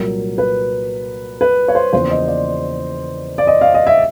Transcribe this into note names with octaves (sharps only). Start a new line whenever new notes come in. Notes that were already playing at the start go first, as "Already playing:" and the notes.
Already playing: C2 A#2 F#3 A#4
B4
B4
C#5
C5
E2 C#3 F3 A#3 C5
D#5
D5
D5
D#5
F5
D#5
E5